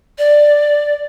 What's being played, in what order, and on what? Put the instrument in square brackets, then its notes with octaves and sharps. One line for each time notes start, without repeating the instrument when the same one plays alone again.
[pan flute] D5